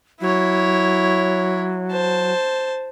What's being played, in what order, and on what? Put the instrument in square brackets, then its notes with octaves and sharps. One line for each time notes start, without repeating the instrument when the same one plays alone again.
[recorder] F#3 [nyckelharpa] E4 C#5
[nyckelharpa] C5 A5